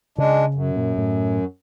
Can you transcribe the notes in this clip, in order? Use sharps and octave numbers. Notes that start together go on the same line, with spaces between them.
C#3 G#3 D4
F#2
A#2
A2